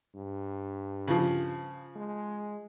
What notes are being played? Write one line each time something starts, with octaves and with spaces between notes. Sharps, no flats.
G2
C#3 F3
G#3